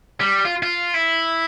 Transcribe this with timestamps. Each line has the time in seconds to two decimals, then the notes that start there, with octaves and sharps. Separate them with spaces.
0.20 G3
0.45 F4
0.63 F4
0.94 E4